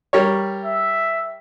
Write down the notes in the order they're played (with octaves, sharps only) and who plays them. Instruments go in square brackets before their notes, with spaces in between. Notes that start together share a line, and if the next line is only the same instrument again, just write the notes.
[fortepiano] G3 A#4 C#5
[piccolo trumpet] E5